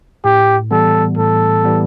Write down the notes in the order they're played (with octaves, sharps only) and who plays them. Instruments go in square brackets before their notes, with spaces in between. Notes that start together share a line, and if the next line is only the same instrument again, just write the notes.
[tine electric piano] A2 [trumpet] G4
[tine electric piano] E3 G3 B3 [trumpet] A4
[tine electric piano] A2 [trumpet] A4
[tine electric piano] E3 G3 B3